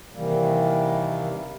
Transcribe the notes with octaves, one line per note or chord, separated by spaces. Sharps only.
C3 D#3 E3 G3 A#3